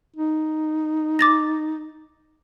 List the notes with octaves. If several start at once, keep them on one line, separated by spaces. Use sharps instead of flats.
D#4
D6 A6 A#6